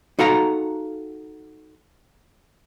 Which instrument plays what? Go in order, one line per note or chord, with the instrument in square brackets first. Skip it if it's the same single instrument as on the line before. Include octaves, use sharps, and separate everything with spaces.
[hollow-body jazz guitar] D#4 F#4 A4 F5 A#5